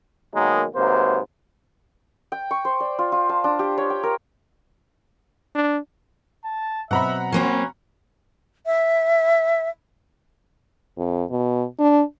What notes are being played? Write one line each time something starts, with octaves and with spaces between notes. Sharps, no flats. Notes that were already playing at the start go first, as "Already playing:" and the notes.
B2 D#3 F#3 G#3 A#3 D#4
G#2 C3 F#3 A#3 B4 C5
G5
C#6
C5
D5
F4
F4
A5
D4
G4
C#5
G5
A#4
D4
A5
B2 F#3 C4 E5 F#5 A#5 B5
F#3 A#3 C4 C#4 C6 C#6
E5
F2
B2
D4